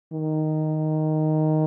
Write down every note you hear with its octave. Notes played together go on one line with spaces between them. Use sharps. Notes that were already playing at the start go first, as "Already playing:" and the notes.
D#3